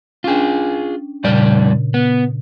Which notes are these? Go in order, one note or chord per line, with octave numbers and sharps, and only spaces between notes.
C#4 D4 F4 G#4 G5
F2 A#2 C#3 G3 D5
B3